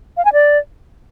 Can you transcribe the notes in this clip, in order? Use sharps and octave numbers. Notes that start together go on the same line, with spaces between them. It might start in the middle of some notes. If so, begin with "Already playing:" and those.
F5
G#5
D5